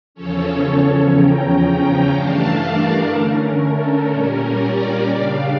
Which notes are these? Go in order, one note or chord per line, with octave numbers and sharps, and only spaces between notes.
E2 C#3 F3 C#4 A4 C#5
E2 C#3 F3 C#4 G5 A#5
G2 E3 A3 D4 F5 A5
A#4 D5
D3 A3 C#4 A#4
A4
A#2 G3 C#4 A#4
A#4 D5
C#3 G3 D4 D5 F5